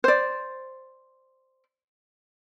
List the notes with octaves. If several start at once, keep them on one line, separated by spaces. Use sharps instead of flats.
C5 D5